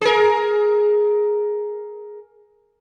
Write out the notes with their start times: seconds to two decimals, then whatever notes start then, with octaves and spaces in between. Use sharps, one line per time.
0.01 G#4 A#4